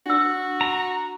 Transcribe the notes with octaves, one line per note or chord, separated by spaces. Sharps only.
D4 F#4 E6
A#5